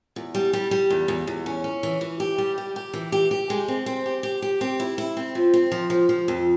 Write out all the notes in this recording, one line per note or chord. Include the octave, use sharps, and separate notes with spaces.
E2
G3
G3
G3
E2
E2
E2
C#4
C#4
E3
E3
G4
G3
G4
G4
E3
G4
G4
G#3
C4
C4
G4
G4
G4
C4
E4
E4
C4
F3
C4
F3
F3
F3
F2